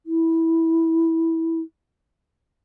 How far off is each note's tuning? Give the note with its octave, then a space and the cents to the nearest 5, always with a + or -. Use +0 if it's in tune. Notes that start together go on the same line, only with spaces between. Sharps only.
E4 -10